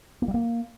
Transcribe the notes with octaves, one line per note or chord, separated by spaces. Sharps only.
A#3
G3
A#3